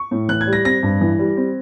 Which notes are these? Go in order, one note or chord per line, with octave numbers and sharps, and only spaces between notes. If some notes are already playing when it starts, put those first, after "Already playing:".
Already playing: C#6
A2
E3 F#6
G#6
G3
A#6
C4 A#6
G2
E3
G3
C4